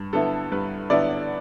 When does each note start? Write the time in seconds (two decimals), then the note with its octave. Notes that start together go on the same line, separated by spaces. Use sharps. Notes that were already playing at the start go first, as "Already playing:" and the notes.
Already playing: G2
0.13 D3 B3 E4 A4
0.52 G2 B4
0.90 D3 B3 E4 D5